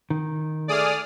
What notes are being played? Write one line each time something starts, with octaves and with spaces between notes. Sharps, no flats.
D#3
A3 G#4 D5 D#6 F6